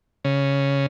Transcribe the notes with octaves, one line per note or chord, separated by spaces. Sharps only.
C#3